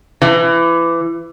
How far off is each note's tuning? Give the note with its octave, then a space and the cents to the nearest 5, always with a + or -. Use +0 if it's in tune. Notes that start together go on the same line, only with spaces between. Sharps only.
E3 +25